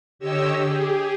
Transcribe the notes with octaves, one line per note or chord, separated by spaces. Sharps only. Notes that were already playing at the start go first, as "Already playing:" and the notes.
D3 G4 C#5 D#5 E6
G4 G#4